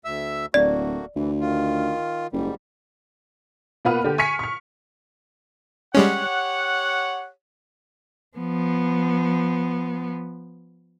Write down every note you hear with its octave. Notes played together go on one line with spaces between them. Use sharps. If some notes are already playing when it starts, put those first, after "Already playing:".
D2 E5 E6
D1 A3 A#3 F#4 D5
D2 E3
D#3 F4
F#1 G#2 G3
B2 A#3 F4 B4 F#5 F6
D3 G4
G#5 C#6 F6 B6 C#7
C#6 F6
G3 G#3 C#4 G4 C#5 F#5
F3 B3